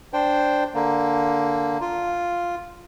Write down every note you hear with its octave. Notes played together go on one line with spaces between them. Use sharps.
D4 C5 G5
D3 A#3
F4